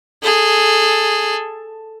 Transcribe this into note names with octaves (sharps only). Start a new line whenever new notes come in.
G#4 A4